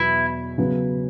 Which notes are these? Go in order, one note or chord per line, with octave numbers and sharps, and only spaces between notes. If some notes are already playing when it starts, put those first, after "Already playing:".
Already playing: E2 B2 F#3 B3 E4
C#3 F#3 B3